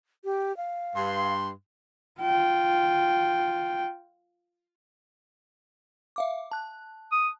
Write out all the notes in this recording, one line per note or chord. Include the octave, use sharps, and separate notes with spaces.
G4
F5
G2 C6
F4 G5
E5 F5 D6
A5 F#6
D#6